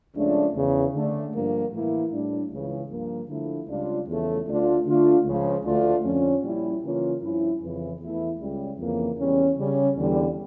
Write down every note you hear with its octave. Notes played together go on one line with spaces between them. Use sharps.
C#2 C#3 F3 A3 D4
E2 C#3 E3
D3 A3 D4
G2 D3 F3 A#3
A2 E3 A#3 E4
A2 G3 D4
C#2 C#3 E3
G2 F3 A#3
D3 F3 A3 E4
C#2 C#3 G3 D4 F4
E2 C#3 F3 A3
D2 D3 A3 D4 F4
D3 A3 D4 F4
C#2 C#3 F3
D2 D3 A3 D4 F4
F2 D3 F3 C#4
A#2 G3 C#4 E4
C#3 E3 A#3 C#4 F4
G2 F3 C#4 E4
F2 C#3 E3
E2 E3 A3 E4
C#2 C#3 G3
F2 C#3 E3 A#3
E2 C#3 G3 C#4
C#3 G3 C#4
E2 D3 G3